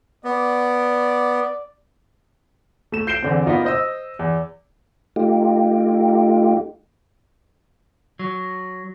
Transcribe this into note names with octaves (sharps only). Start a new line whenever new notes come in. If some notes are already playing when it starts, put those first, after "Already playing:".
B3 D5
A3 E7
G6 C7 D7 E7 G7
E2 D3 C4
A#3 B3 D4 D#4 F4
C5 D#5 E6
E2
A3 D#4 F4 G4
F#3